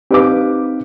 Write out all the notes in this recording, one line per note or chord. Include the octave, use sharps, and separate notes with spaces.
C4 D#4 G4 B4 F5 D6